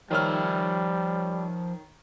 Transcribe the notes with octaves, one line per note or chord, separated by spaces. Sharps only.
D#3 F3 G3 C#5 E5 F6